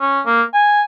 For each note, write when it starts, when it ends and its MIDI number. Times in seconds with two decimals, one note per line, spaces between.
0.01 0.21 61
0.26 0.43 58
0.54 0.82 80